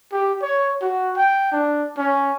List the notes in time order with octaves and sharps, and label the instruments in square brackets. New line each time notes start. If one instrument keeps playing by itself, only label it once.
[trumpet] G4
C#5
F#4
G5
D4
C#4